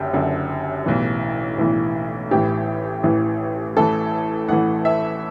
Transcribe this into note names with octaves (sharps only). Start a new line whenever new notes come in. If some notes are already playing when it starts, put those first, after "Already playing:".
Already playing: F#1 F#2 D3 G4
F#1 F#2 D3
B1 A2 E3
B1 A2 E3
A1 A2 E3 G4
A1 A2 E3
A1 A2 E3 A4
A1 A2 E3 F#5
E5